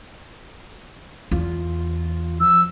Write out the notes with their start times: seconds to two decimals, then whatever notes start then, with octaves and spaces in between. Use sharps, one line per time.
1.31 E2 F4
2.40 F3 E6